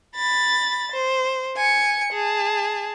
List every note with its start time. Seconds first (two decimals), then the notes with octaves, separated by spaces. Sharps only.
0.15 B5 A6
0.92 C5
1.56 G#5 C#7
2.12 G#4 A5